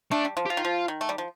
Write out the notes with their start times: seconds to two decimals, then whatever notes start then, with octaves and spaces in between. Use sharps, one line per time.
0.11 A3 D4
0.25 G3
0.37 F3
0.46 G4
0.50 F3 F4
0.57 D#3
0.65 F3
0.88 D#3
1.01 A3
1.09 G3
1.18 F3